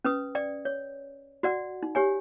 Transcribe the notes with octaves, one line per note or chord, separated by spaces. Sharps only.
C#4 B4 D#6
D5 G5
C#5
F#4 D5 F#5
D#4
G4 C#5 G#5